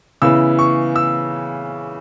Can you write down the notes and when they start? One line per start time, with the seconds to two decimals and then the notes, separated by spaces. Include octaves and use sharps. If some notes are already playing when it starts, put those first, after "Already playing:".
0.22 C#3 E3 B3 E4 E6
0.59 C#6
0.96 E6